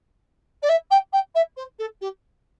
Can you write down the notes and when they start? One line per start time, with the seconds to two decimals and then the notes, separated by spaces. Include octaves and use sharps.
0.62 D5
0.69 E5
0.91 G5
1.13 G5
1.35 E5
1.56 C5
1.79 A4
2.01 G4